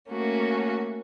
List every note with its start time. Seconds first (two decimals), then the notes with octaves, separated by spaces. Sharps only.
0.10 A3 A#3 C#4 F#4